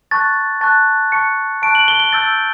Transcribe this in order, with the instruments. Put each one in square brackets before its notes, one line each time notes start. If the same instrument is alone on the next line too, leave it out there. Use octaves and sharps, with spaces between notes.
[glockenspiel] A5 C#6 F#6 A6
A5 C#6 F#6 A6
A5 C#6 F#6 C#7
A5 C#6 F#6 D7
F#7
G7
G7
A5 E6 G6 A6